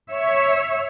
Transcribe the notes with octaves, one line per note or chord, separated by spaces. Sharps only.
C#5 E5